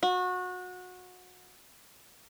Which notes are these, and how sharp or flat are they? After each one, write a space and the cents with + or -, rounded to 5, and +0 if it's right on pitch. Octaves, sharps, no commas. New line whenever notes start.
F#4 -25